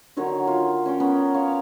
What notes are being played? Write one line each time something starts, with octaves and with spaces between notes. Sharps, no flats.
D3 D#3 F#3 C#5
F4
C#4 C#5 G5
B3 C#4 A#4
C#5 F5